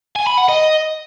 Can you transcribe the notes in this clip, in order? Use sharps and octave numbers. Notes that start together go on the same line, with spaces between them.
G#5
B5
F#5
D#5